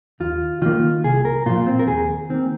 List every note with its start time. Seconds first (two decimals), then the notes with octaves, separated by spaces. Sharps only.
0.20 D#2 F4
0.62 D#3 A#3 F4
1.04 C2 G#4
1.25 A#4
1.46 A#2 F3 F4
1.67 C4
1.79 A#4
1.88 D#2 G#4
2.30 D#3 A#3 C4